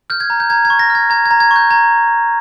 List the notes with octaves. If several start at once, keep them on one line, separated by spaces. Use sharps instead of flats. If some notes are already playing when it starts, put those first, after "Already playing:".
F6 G6
G#6
A#5
G6
A#5 G#6
G#6
C#6
A#6
F6
G#6
A#5 G#6
G#6
A#5
G#6
C#6
G6
A#5 G#6